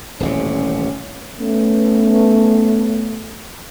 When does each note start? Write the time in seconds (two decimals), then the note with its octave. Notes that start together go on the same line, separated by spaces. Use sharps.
0.20 D#1 A1 C3 C#4
1.40 A3 B3 C#4